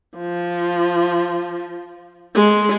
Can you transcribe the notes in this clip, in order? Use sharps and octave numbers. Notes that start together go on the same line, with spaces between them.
F3
G#3